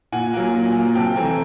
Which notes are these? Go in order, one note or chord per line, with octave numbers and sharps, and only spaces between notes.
A#2 F#5 G#5
F#3 A#3
A#2
F#3 A#3
C3 G5 A5
E3 A3 C4 G#5 A#5